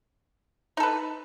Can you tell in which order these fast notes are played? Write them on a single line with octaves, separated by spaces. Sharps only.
D#4 A4 B4